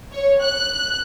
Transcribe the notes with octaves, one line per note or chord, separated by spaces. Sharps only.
C#5
F#6